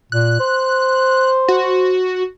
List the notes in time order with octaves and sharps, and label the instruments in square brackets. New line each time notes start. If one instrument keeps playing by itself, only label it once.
[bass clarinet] A#2 [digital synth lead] F#6
[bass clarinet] C5
[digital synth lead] F#4